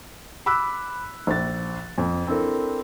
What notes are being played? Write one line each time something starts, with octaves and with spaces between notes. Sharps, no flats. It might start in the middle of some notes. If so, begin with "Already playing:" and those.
B5 D6 E6 F#6 B6
A#1 A6
F2
C4 D4 E4 A4 A#4